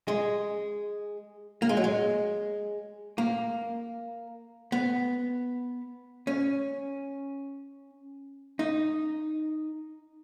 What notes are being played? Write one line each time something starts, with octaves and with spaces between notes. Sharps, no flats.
G#3
A#3
G#3
F#3
G#3
A#3
B3
C#4
D#4